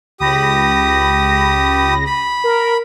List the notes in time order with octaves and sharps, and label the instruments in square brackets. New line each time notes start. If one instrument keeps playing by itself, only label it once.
[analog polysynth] C#2 B5 A#6 [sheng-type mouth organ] G4 D#6
[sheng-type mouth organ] B5
[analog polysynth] A#4